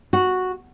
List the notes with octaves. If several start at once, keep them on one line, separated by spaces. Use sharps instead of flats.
F#4